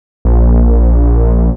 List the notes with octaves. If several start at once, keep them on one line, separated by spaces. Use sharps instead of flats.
A#1